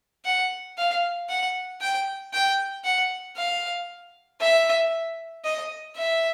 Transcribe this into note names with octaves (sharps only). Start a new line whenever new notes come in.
F#5
F5
F#5
G5
G5
F#5
F5
E5
D#5
E5